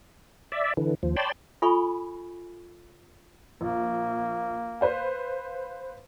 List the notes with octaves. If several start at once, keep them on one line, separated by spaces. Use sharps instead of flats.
D5 E5
D3 E3
D#2 F3
C#5 D5 G5 A5 B5 C6
F4 A4 G#5 B5 C#6
A#1 A#3
B4 C5 F5